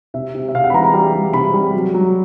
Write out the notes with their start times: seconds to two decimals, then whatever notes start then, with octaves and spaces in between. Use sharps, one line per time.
0.14 C3 E5
0.35 C3
0.48 E5
0.54 C3 F5
0.64 F#5
0.70 B5
0.74 E3 A#5
0.84 A#5
0.94 G3
1.14 G3
1.33 C3 B5
1.54 G3
1.74 F#3
1.94 F#3